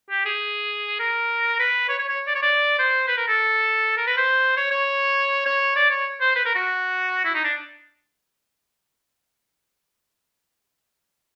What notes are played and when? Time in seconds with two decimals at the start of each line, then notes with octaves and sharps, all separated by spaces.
0.11 G4
0.26 G#4
1.00 A#4
1.60 B4
1.89 C#5
1.99 C#5
2.09 C#5
2.27 D5
2.35 C#5
2.43 D5
2.79 C5
3.08 B4
3.18 A#4
3.28 A4
3.97 A#4
4.07 B4
4.17 C5
4.57 C#5
4.71 C#5
5.46 C#5
5.76 D5
5.91 C#5
6.21 C5
6.36 B4
6.46 A#4
6.55 F#4
7.25 E4
7.35 D#4
7.44 D4